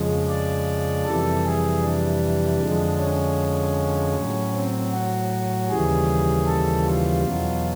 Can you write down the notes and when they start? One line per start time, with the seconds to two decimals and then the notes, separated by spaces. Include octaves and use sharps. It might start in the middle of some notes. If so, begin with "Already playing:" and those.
Already playing: F2 C#3 F3 G#3
0.29 D5
1.06 F2 C3 E3 G3 A4
1.45 G#4
1.83 D4
2.61 F2 D3 F3 G#3
2.99 C#4
4.15 A2 F#3
4.54 C4
4.92 F#4
5.69 D#2 C#3 E3 G3 G#4
6.47 A4
6.85 F4
7.24 E2 B2 F#3